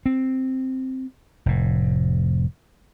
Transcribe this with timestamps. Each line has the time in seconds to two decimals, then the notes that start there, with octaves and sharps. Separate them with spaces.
0.06 C4
1.46 F1 A2